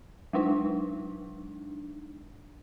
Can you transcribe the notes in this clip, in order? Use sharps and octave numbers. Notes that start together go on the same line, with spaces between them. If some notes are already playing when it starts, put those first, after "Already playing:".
F#3 G#3 D4 D#4